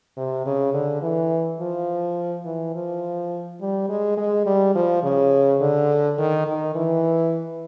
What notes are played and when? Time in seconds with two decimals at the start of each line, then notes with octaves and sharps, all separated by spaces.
0.17 C3
0.46 C#3
0.74 D3
1.02 E3
1.60 F3
2.45 E3
2.75 F3
3.61 G3
3.89 G#3
4.17 G#3
4.46 G3
4.75 F3
5.03 C#3
5.61 D3
6.19 D#3
6.47 D#3
6.75 E3